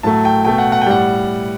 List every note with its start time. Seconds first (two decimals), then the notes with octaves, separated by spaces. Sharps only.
0.03 A2 F#3 A3 A5
0.25 G5
0.45 B2 A3 G5
0.58 F#5
0.72 F#5
0.81 G5
0.86 A2 G3 F#5